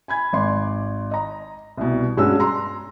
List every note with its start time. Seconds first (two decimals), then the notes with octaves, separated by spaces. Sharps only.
0.08 G#5 B5 G#6
0.33 G#1 D5 C6
1.11 D#5 A#5
1.77 C2 B2
2.17 G2 G#3 C#4 D4 F#4 E6
2.40 A#5 C6